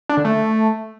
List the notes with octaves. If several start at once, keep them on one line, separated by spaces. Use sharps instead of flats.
D4
D3
A3